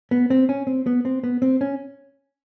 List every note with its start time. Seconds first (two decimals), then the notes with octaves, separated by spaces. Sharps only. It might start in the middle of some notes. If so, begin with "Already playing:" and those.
0.11 B3
0.30 C4
0.49 C#4
0.67 C4
0.86 B3
1.05 C4
1.24 B3
1.42 C4
1.61 C#4